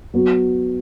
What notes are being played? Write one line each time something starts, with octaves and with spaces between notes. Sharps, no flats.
F#3 B3 F#4